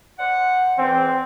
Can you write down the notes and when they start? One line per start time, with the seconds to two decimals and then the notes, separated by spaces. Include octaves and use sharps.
0.19 C5 D5 F#5
0.78 E2 G#2 E3 C4